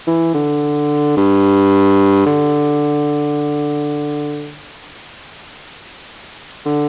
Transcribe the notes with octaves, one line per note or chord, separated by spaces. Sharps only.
E3
D3
G2
D3
D3